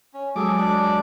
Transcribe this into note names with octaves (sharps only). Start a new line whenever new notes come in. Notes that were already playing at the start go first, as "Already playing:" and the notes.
C#4
F#3 G#3 G#4 A4 D6
D4 D5